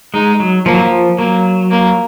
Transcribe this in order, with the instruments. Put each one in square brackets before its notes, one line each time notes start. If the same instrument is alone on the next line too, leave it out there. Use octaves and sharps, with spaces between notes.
[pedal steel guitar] G#3 [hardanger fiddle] D#4
[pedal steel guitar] F#3
[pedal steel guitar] F3 [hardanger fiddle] A#3
[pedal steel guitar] F#3
F3
[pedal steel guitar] F#3 [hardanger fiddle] A#3
[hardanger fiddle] A#3